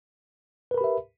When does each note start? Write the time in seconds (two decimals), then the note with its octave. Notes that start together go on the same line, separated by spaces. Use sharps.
0.71 B4
0.74 A#4
0.78 B5
0.81 G4
0.84 E5